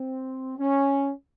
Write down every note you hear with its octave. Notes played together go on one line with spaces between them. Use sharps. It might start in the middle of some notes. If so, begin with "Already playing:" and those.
Already playing: C4
C#4